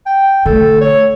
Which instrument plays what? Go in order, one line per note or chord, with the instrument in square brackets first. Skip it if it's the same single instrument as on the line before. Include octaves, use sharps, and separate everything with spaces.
[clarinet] G5
[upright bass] D3 A3 [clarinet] A4
[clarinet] C#5